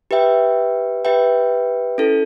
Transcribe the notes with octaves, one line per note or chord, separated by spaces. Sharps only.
G4 B4 E5 G5
G4 B4 E5 G5
C#4 E4 A4